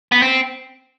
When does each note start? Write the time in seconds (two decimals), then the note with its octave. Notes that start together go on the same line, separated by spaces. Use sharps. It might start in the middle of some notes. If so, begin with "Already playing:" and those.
0.12 B3
0.22 C4